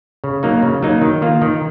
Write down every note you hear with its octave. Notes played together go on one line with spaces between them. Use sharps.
C#3
F#3 A#3 D#4
C#3
F#3 A#3 D#4
D#3
A#3 F4
D#3